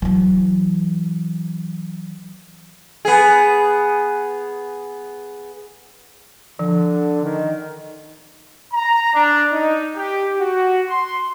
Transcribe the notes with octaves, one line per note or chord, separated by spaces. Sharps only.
E3 F#3
B3 G#4
D3 F3
D#3
A#5
D4
D#4
G4
F#4
C6